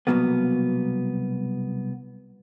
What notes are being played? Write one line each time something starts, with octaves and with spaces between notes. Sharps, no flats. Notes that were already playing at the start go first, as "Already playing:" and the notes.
C2 F#2 B2 F#3 A#3 B3